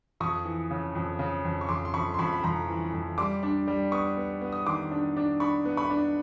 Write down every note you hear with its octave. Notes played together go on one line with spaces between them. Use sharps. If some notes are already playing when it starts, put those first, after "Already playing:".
F2 C#6 D#6
E3
C#3
F2
C#3
F2
C#6
F2 C6 D6
C6
F2 B5 C#6
C6
F2 B5 C#6
B5
F2 A#5 C6
E3
F2
G3 C6 D6
D4
G3
B3 C#6 D#6
B3
B3
D#6
D#3 C6 D6
D4
D4
D4 B5 C#6
B3
B5 C#6
D4